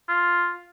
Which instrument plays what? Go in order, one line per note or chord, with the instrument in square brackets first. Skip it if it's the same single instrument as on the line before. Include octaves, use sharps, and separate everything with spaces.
[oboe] F4